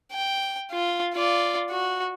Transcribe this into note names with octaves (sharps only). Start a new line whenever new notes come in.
G5
F4
F4 D5
F#4